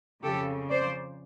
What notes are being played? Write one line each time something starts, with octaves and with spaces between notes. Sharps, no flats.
F2 C#3 F3 G4 A4
C5 D5